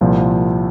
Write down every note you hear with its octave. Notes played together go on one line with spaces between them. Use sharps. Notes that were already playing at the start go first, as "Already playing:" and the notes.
C2 A#2 F3